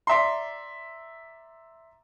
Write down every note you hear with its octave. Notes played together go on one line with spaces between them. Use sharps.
D5 E5 A#5 C6